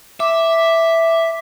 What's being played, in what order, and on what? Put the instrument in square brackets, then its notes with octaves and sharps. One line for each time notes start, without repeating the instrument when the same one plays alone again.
[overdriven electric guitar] E5 [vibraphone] D6